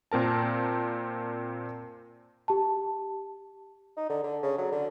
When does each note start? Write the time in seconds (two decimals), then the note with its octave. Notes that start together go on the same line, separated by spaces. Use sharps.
0.12 A#2 C4 A#4 A5
2.48 G4 A5
3.97 D#4
4.09 D3
4.24 D3
4.43 C#3
4.58 F#3
4.72 D3